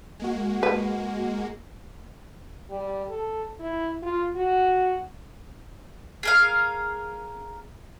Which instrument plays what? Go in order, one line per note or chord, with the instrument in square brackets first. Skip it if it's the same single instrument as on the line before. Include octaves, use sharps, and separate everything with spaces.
[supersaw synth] G#3 A#3 F#4
[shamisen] B4
[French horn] G3
A4
E4
F4
F#4
[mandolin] G#4 A#4 F5